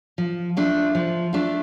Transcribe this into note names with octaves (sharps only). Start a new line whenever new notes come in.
F3
A3 D4 F4
F3
A3 D4 F4